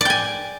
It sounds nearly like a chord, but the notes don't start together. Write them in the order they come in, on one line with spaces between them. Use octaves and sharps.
D5 G5 G#5